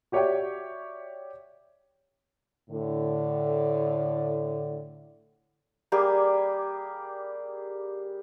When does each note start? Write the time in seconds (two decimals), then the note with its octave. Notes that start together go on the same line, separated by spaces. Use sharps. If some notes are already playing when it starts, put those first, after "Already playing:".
0.12 F#4 G4 C#5 D5 E5 G5
2.70 A2 D3
5.92 G3 A#3 G4 G#4